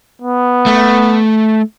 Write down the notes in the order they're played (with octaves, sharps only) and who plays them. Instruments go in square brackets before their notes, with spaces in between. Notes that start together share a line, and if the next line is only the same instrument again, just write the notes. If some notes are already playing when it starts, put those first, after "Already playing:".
[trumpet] B3
[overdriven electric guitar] A3